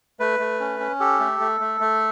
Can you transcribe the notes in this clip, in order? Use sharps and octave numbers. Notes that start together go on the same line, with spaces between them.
A3 B4
A3
C#4
C#4
G4 A4
A3
A3
A3
A3